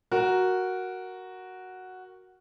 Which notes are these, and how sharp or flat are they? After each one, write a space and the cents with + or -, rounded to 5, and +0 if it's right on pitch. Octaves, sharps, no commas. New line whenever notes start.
F#4 +0 A#4 +0